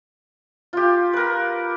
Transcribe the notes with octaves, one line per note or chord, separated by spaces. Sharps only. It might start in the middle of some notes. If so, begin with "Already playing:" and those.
F4 G4
A#4 B4